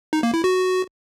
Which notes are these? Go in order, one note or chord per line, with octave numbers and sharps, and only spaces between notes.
D#4
A#3
E4
F#4